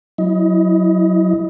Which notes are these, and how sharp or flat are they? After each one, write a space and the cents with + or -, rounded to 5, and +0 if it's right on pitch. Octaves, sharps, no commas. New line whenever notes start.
F#3 +0 E4 +0 D#5 +25